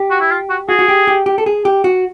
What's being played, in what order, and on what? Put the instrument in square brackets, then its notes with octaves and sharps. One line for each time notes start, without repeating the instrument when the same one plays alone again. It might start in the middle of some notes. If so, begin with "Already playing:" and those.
Already playing: [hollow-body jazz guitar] G4
[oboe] F#4
E4
F4
F#4
[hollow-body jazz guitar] F#4 [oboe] G#4
[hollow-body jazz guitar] F#4
G4
G4
G4
A4
G#4
G4
F#4